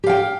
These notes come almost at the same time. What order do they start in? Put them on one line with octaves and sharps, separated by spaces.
G4 F5 G5